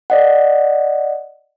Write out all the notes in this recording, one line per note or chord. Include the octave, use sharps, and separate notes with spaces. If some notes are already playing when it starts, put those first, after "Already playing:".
D5 D#5 F#5